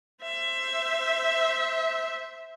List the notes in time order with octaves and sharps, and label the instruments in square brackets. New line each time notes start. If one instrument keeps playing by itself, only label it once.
[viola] C5 E5